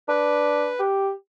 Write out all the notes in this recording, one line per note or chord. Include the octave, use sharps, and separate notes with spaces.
D4 B4
G4